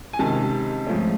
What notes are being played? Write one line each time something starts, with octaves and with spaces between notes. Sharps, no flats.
G#5
C#2 C3 D#3 A5
G#2 F3 A3 C#4